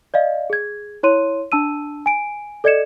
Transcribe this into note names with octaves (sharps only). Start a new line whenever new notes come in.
D5 D#5 F5
G#4 G#6
E4 C#5 C6 D#7
D4 A5 E6 D#7
G#5 D7
A4 D5 D#5 G#6 C#7 E7